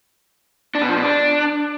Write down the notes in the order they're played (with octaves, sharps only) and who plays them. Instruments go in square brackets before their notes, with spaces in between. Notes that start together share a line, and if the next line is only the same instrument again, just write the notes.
[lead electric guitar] D4
B2
F3
B2
D4